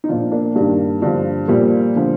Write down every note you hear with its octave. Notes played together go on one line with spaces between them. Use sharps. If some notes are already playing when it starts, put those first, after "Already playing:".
D#4
A#2 F3 D4 F4
A#3 D4
G2 D#3 G3 A#3
G2 D3 F3
A#2 F3 G3 A#3
D3 F3